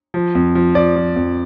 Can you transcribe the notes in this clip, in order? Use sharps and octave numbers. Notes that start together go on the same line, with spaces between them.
F3
F2
F3
F3 D5
F3
F2